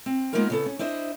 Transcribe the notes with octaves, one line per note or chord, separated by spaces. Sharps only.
C4
G#3 A#3 B3 D#4 F4 A#4
C#3 B3 A4
C#4
D4 E4 C5 D#5